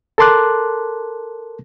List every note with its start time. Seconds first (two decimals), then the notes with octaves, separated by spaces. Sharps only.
0.18 A4 A#4 A5 C6 D6 F#6